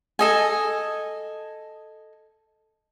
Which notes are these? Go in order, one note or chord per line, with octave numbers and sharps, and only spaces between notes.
A4 D#5 G#5